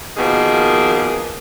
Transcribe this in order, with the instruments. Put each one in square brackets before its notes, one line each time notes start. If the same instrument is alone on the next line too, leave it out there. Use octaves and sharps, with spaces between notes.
[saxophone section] B2 D#3 F3 A#3 G#4